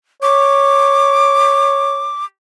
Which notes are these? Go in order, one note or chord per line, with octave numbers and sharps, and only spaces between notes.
C#5 D6